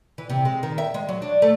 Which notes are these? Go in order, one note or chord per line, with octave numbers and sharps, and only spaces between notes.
E3
C3
G#3
D#3
E5
G#3
F#3
D4
A3